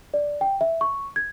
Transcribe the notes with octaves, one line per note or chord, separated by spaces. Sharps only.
D5
G5
E5
C#6
G#6